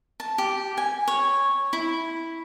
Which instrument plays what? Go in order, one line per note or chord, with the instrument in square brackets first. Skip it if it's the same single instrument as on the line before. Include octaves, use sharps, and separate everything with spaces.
[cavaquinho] A5
G4
G#5
C#5
E4